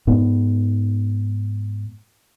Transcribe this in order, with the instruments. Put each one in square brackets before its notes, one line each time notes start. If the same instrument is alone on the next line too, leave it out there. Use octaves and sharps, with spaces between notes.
[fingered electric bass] G#2 B3